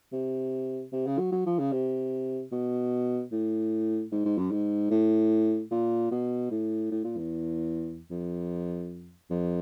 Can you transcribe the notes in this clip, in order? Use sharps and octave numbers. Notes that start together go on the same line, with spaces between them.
C3
C3
C#3
F#3
F#3
F3
C#3
C3
B2
A2
G#2
G#2
F#2
G#2
A2
A#2
B2
A2
A2
A#2
E2
F2
F2